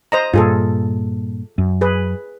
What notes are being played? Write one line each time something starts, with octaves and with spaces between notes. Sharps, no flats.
C5 D#5 A#5
G2 A#2 F4 G#4 A4
F#2
G#4 B4